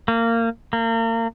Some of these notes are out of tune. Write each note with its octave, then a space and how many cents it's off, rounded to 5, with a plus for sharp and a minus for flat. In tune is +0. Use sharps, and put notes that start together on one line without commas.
A#3 -20
A#3 -35